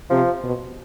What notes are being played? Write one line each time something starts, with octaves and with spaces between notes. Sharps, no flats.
C3 F3
B2